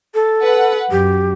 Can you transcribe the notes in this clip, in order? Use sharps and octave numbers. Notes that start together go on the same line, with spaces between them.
A4
B4 F#5
F#2 G4